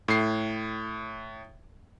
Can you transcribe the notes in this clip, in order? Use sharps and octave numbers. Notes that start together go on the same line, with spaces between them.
A2 C7